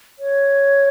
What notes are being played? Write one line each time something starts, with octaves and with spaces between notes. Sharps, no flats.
C#5